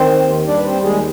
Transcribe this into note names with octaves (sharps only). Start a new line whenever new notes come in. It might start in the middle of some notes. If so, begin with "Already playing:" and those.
Already playing: D#3 C4 C5
D#2
G3 D4 D5
B4
C4 C5
D#2
G#3 G#4